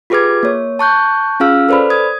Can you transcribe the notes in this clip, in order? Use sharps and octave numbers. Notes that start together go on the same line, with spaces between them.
F4 G4 G#4 B4 D6 G#6
A#3 C#5
A5 C#6 F#6 G6
C#4 F4 G#4 F5 E6 F6
A4 B4 C5 D5 B5
D#6 G#6